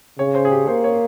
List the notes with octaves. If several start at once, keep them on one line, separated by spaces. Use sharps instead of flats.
C#3 C#5
C5
G#4
G4
A#3 C5
C#5